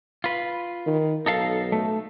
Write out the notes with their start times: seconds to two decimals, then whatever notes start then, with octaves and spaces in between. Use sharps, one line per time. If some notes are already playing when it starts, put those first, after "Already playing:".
0.24 F4 B4
0.86 D#3
1.26 B1 D#4 A4 F5
1.72 A3